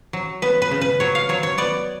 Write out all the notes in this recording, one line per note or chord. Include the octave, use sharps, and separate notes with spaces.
F#3
B3 B4
B4
C#3
B4
F#3 C#5
F5
F#3 C#5
C#5
B3 D5